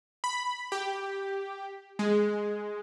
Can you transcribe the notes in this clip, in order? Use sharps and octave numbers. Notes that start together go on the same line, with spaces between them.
B5
G4
G#3